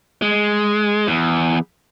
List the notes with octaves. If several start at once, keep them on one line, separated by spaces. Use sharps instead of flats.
G#3
E2